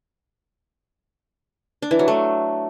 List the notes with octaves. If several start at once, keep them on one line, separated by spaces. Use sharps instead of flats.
D4
E3
F#3
A3